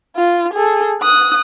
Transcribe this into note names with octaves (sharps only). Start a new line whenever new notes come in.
F4
G#4 A4
D#6 F#6